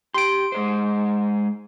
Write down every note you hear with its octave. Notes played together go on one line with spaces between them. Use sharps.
G4 C6 D7
G#3 G#4 C5